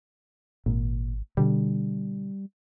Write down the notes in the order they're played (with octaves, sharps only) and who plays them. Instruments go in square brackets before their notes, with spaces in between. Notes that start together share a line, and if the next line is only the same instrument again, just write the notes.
[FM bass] G#1 [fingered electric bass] A#2
[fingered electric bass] B2 D3 [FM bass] G3